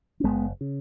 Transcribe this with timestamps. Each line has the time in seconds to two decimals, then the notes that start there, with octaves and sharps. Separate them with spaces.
0.20 C#4
0.23 F#1 G#3 B3
0.61 C#3